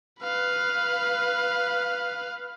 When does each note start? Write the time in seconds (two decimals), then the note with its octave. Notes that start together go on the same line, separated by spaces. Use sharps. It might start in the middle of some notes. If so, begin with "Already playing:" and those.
0.21 B4 F5